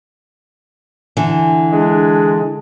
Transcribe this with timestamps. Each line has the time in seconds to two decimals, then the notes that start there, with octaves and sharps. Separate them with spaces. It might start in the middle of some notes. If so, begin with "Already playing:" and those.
1.17 D3 E3
1.72 G#3 D4